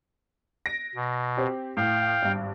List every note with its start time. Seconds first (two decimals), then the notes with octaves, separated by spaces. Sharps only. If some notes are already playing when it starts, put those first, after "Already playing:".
0.66 A#6 D7
0.95 B2
1.37 C4 G4
1.77 A2 F5 G5
2.22 G#1 G2